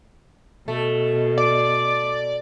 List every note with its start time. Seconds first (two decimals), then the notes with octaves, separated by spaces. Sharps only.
0.68 B2 A3
1.38 D5 D6